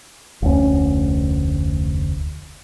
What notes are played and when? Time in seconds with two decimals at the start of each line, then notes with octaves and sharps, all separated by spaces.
0.42 F1 D2 C#4